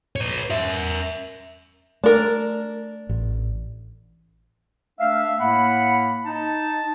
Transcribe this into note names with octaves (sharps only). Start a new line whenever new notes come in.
B4 C#5
A#4 E5
A3 D4 A#4
A1
A3 D4 E5 F5
A2 A#3 F#5 B5
D#4 A5